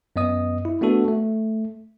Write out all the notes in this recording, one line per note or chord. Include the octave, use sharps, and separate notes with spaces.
F#2 B3 D#5 D#6
E4
A3 B3 D4 F#4 A4
A3